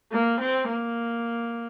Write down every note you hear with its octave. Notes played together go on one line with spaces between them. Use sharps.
A#3
C4
A#3